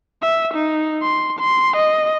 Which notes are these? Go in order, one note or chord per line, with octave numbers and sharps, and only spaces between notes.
E5
D#4
C6
C6
D#5